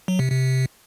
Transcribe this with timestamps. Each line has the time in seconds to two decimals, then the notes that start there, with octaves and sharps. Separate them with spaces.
0.08 F#3
0.19 C3
0.30 C3